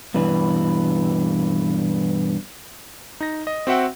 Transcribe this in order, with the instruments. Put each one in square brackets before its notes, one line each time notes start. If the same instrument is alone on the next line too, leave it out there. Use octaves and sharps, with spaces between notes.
[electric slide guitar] G2 B2 E3 B4
[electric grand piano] D#4 A#6
D#5
C4 F#4 E5 F#5 G5